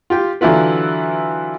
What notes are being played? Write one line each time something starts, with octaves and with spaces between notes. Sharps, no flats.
F4 G4 G5
D3 E3 F#3 E4 F4 B4